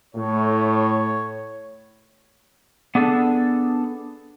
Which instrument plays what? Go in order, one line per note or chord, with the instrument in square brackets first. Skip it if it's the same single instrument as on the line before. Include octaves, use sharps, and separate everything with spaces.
[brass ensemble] A2 [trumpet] C#5
[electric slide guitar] B3 D4 G#4 A4